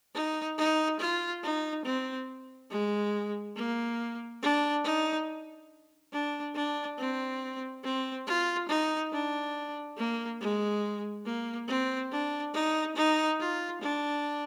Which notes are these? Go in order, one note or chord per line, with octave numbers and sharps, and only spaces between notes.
D#4
D#4
F4
D#4
C4
G#3
A#3
D4
D#4
D4
D4
C4
C4
F4
D#4
D4
A#3
G#3
A#3
C4
D4
D#4
D#4
F4
D4